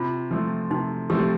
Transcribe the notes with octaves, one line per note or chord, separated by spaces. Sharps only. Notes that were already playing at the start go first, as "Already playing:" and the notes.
Already playing: C3 F4
F3 A3 C4
C3 D#4
F3 A3 C4 G4